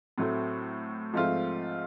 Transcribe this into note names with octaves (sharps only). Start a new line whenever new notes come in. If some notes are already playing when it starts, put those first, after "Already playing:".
A2 F#3 A3 C4
G#2 F3 A3 C4 F4